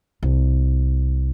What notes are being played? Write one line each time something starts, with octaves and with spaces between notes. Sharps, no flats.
C2